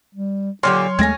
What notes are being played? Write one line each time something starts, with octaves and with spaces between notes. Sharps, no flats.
G3
A#2 D3 F#3 G4 C#5 C6 F6
D#2 G#3 A3 C4 C#4 G#6 A#6